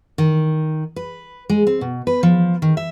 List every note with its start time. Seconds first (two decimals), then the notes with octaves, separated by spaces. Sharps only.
0.18 D#3
0.96 B4
1.49 G#3
1.67 C4
1.81 B2
2.07 B4
2.23 F3
2.62 D#3
2.77 E5